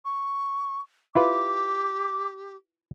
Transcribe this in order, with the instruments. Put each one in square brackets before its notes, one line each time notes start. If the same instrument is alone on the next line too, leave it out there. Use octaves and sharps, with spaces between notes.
[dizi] C#6
[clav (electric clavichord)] E4 F4 B4 [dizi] G4 [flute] D6